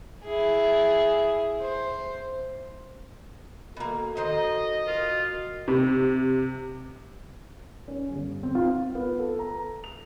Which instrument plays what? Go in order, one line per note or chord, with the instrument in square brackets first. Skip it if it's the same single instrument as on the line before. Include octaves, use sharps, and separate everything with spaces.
[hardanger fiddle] E4 G#4
C5
[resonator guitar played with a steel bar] B2 A#3 [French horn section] F#4 A4
[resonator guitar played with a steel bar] D#3 C5 [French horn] D#5
[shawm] F4 [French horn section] F#4 A#4
[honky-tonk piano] C3
[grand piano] C#4
G1
C4
F4
B3
A4
A#5
F7